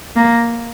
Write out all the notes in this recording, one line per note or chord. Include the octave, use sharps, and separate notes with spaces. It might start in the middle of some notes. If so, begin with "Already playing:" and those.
A#3